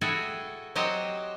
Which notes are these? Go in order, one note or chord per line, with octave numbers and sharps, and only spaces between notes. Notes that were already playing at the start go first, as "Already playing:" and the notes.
E4 F#4 G#4 A4 G5
F#3 C4 G4 C5 D#5 F#5